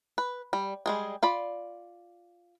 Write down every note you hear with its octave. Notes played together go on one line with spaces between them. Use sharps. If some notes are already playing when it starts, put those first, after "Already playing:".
B4
G3
G3 G#3 G#4
F4 D5 B5